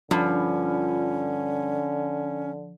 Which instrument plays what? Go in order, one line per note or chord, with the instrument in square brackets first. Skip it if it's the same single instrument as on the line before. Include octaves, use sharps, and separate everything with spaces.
[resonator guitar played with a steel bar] G2 [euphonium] D3 [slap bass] F3 [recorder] C#4